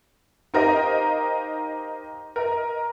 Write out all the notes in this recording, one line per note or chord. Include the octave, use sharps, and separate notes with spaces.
D#4 G4 A#4 C5 D#5 F5
A#4 D#5